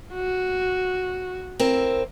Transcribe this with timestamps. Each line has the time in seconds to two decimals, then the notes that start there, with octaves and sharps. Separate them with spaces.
0.14 F#4
1.60 C4 E4 A#4